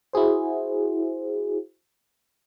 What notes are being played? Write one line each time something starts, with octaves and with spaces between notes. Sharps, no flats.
E4 F#4 G#4 C5